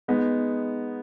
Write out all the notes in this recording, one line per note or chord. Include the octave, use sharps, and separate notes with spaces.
G#3 B3 D#4